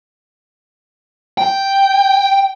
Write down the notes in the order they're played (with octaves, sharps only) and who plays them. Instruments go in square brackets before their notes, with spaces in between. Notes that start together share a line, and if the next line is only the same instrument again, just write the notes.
[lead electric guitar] G5